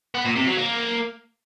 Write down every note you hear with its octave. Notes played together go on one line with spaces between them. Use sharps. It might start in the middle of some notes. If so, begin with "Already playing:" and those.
B3
A#2
C3
F#3
A#3